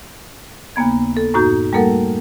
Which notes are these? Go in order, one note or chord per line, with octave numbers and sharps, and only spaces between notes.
D#2 C#3 A#3 B3 G#6
A4
F#2 A2 D#4 F#4 A#5 G6
G3 A3 A#3 A4 A#4 F#5